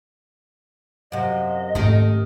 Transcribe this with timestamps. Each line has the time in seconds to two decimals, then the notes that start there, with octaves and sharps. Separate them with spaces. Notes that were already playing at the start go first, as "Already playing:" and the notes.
1.12 F#2 C3 D#5 F5 F#5
1.75 G#2 D#3 A3 C#4 G4